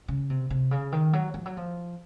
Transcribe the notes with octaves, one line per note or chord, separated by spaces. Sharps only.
C#3
C3
C3
C#3
D#3
F#3
F3
F#3
F3